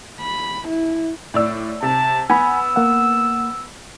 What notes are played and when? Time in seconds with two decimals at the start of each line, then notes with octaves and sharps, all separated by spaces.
0.21 B5
0.69 E4
1.34 A2 D5 E6
1.82 C3 A5
2.30 B3 G#5 B5 E6
2.76 A#3 F#5